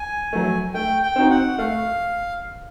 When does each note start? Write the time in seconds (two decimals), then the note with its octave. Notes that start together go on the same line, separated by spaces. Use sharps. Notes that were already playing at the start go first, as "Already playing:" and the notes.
Already playing: G#5
0.33 F#3 A3
0.74 A3 G5
1.02 G5
1.16 C4 D#4 F#4
1.30 F#5
1.58 A3 F5